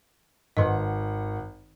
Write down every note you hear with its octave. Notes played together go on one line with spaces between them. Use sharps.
G#1 D#3 D#5 F#5